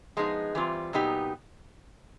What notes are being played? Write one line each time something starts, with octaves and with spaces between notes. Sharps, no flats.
F3 G#3 B3 D#4 G#4
E3 G3 C4 F4
A#2 F#3 B3 D#4 G4